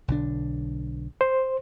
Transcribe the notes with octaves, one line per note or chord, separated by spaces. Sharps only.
B1 D3 D4
C5